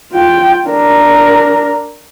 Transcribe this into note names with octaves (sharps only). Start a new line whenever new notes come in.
F4 G5
D4 A#4